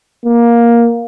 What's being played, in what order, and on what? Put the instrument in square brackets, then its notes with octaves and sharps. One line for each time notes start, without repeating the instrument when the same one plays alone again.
[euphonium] A#3